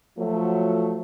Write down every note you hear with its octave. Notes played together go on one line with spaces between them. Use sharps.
F3 F#3 A3